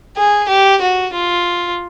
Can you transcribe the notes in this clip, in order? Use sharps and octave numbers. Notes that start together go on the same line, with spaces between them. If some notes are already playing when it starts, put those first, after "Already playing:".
G#4
G4
F#4
F4